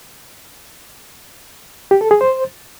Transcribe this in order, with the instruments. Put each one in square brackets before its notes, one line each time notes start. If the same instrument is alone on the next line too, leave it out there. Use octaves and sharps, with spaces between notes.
[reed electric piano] G4
A4
G#4
C5